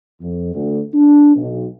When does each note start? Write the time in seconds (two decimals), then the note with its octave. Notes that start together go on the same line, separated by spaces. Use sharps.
0.21 F2
0.54 D2
0.94 D4
1.36 B1